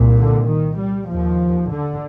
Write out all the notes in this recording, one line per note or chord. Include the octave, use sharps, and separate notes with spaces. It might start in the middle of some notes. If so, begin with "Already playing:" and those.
Already playing: C2 A#2
D3
D#3
G3
D#2 F3
D3